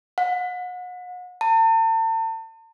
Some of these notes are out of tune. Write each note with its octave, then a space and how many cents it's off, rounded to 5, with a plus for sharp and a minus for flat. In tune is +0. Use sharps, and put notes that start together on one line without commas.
F#5 -35
A5 +40